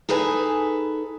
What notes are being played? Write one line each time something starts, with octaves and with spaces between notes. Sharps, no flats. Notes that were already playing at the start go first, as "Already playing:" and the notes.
D#4 G#4 A4 B4 G#5